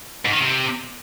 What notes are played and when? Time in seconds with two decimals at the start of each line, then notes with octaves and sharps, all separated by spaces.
0.25 G#2
0.33 D#3
0.41 C3